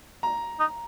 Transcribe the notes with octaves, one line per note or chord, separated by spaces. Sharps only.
A#5
D#4